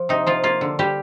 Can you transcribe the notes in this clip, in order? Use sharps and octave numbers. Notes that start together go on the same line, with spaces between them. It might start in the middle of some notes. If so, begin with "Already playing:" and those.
Already playing: F3
C3 D#4
F3 F4
A#3 F4
D3
G3 G4